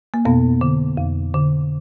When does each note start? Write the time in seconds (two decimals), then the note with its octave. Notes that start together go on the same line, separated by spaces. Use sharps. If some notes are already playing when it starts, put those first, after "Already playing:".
0.14 A#3
0.25 F2 B2 B3
0.61 D3
0.98 F2
1.34 D3